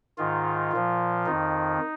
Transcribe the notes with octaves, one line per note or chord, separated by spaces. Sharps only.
G#2 D#3 F4
A#2 F3
F2 D#3 D#4